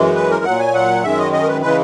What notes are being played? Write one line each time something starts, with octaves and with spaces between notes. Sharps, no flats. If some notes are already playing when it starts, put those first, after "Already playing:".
Already playing: F#2 E3 G#3
B4
A#4
A#2 F#3 F#5
G#5
F#5
F#2 D#3 G#3 E5
D#5
D#5
A#4
B4
C#3 E3 G#3 B4